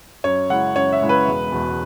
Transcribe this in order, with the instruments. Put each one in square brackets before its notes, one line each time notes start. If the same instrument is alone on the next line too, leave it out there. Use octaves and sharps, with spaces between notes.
[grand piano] F#2 C#5
C#3 G#3 E4 F#5
F#2 C#5
E5
C#3 G#3 E4
B4
E1
E2 B2